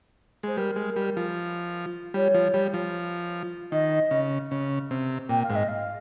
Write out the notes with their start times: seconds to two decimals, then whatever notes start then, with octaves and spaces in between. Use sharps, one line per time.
0.43 G#3 C5
0.57 G3 A#4
0.76 G#3
0.96 G3
1.17 F3
2.14 G3 C#5
2.34 F3
2.54 G3
2.74 F3
3.72 D#3 D#5
4.11 C#3
4.51 C#3
4.91 C3
5.29 A#2 G5
5.43 F5
5.50 G#2
5.55 D#5
5.68 F5